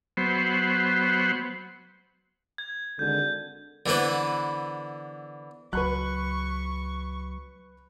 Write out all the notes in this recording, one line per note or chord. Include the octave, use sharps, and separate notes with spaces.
F#3 B3 C5
G#6
G#1 D3 G6
D3 E3 B3 B4 C5
C#2 F#3 B4 B5 C#6 F#6